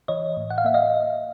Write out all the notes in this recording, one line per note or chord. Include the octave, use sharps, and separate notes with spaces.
E3 C#5 D#5
A2
F#5
F5
A#3 E5
D#5 F5